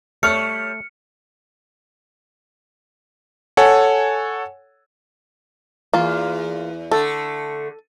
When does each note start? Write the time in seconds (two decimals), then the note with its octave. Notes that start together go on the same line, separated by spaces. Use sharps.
0.23 G3 A3 C#5 F6 C#7
3.57 A4 C#5 F#5 G#5
5.94 E2 A#3 F4
6.92 D3 A3 A4